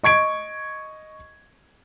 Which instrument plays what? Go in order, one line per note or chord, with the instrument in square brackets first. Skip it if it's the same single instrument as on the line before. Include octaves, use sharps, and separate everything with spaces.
[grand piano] D#5 C#6 G#6 D7